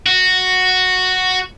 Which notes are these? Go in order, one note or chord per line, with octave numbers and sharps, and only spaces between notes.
F#4